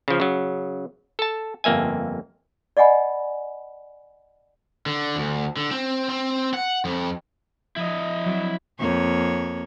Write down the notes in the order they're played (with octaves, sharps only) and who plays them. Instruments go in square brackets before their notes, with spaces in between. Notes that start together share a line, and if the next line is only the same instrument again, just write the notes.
[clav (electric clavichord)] C#3 F3
C#3 F#3
A4 A5
G1 F2 A#3 E5 G#5
[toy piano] D5 D#5 F#5 G#5 B5
[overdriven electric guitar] D3
D2
D3
C4
C4
F#5
F2
[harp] F3 [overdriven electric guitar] E4 D#5
[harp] F#3 C4
[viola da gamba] F2 A#3 C#5